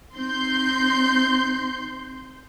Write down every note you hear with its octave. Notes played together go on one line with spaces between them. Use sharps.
C4 D#4 C6 G6